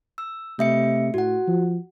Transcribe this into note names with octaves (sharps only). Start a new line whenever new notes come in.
E6
C3 A3 E5 C#7
A2 F#4 F#5
F3